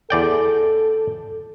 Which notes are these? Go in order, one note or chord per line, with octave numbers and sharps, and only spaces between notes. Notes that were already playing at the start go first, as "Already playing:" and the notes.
E2 A4 D5 G5